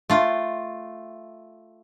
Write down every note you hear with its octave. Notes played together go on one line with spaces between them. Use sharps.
A3 F4